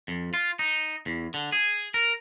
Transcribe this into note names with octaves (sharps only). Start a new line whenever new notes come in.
F2
F4
D#4
E2
D3
G#4
A#4